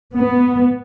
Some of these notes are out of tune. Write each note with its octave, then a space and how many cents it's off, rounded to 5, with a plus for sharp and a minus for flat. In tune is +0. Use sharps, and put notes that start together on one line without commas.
B3 +0